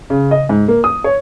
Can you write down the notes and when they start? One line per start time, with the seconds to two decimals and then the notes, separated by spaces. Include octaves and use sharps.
0.10 C#3
0.31 D#5
0.49 G#2
0.68 A#3
0.84 D#6
1.04 C#5